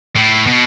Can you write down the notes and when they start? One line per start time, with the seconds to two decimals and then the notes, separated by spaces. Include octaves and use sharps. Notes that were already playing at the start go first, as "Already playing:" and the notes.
0.16 A2
0.47 B2